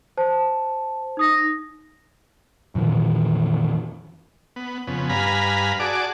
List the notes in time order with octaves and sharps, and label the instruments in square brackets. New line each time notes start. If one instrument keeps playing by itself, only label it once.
[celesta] C5 A5
D#4 D#6 A#6
[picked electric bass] F2 A#2 D#3 E3
[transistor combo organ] B3
F2 C#3 B3
G2 B4 F5 G#5 A#5 B5
F#4 G#4 D5 A5 D6